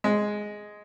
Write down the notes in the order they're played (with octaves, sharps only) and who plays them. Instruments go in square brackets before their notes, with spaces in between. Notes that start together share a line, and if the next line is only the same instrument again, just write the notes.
[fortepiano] G#3